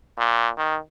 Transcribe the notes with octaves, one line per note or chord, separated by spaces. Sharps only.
A#2
D#3